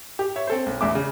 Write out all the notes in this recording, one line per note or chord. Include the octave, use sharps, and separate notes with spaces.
G4
C#5 E5
C4 A4 C5
B1
A1 E2 E5 D6
C#3